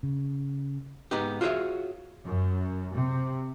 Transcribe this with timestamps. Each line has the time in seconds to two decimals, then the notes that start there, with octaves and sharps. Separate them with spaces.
0.03 C#3
1.11 G#2 B3 D#4 G4
1.41 F4 F#4 G#4 C5 C#5 E5
2.26 F#2
2.95 C3